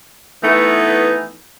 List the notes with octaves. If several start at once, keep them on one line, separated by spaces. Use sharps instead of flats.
E3 A3 B3 D#4